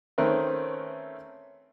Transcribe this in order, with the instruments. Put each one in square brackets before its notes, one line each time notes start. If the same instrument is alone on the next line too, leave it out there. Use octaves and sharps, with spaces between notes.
[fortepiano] D#3 A3 C4 C#4 A#4 B4